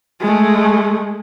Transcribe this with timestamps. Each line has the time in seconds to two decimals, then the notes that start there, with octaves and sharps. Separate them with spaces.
0.21 G#3 A3